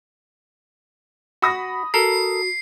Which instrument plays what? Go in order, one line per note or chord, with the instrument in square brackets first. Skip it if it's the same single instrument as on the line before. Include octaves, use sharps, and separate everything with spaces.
[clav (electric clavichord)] F#4 [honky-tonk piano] B5 D#6 A#6
[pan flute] F#4 [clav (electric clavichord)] A4 A#4 [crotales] C7